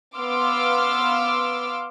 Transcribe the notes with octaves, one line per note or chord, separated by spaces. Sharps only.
B3 F5 C6 D6 E6 F6